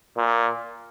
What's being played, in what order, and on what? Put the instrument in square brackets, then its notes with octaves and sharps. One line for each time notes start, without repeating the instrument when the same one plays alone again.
[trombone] A#2